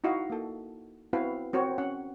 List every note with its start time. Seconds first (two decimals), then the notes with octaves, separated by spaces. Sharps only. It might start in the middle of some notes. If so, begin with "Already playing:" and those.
0.04 D#4 E4 F#4 D#5 F5
0.30 A#3 A4
1.13 B3 C4 E4 F#4 B4 F5
1.53 C4 F#4 A#4 C#5
1.78 C4 C#4 F#5